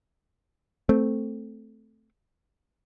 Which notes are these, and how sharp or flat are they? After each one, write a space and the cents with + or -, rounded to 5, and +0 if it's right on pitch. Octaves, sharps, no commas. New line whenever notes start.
A3 +0 C4 -5